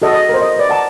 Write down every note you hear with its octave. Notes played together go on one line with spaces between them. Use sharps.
F#4 A4 D#5
D#5
A#4 C5
D#5
B4 D5
F#5 A5 A#5